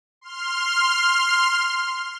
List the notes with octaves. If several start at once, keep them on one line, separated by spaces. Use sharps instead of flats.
C6 F6